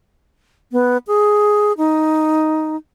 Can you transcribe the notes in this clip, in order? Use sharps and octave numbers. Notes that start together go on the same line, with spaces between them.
B3
G#4
D#4